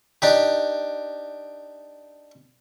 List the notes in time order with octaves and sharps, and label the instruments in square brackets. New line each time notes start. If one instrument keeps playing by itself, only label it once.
[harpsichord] D4 D#4 G4